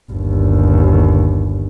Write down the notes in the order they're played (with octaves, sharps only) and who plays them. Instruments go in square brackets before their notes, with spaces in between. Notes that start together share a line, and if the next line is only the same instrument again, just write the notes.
[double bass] G1 D#2